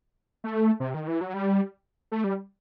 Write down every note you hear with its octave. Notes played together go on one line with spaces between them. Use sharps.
A3
C3
D#3
E3
F#3
G3
A3
G3